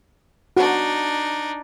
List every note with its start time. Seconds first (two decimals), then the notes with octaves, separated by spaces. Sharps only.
0.57 D4 D#4 F#4